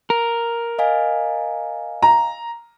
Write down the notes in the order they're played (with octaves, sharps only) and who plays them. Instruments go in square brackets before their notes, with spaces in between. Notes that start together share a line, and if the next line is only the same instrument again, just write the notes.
[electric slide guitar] A#4
[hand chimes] D#5 F5 G#5
[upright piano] A#5